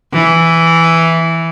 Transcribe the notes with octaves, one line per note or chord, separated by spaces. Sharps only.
E3